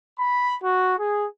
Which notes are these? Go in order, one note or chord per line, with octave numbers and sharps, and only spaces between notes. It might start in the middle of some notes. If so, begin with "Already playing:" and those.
B5
F#4
G#4